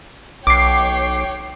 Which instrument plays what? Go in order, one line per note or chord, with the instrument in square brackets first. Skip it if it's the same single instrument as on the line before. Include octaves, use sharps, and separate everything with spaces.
[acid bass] B1 [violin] C#5 G5 [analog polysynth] D6 C7